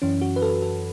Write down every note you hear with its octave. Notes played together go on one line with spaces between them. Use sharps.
F#2 E3 C#4
F#4
B4
A4
A4